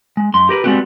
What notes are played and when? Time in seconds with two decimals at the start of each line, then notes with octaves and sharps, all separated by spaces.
0.17 G#3
0.34 F#2 C6
0.49 G4 A#4 B4
0.64 G3 G#3 B3 C4 F#4 G4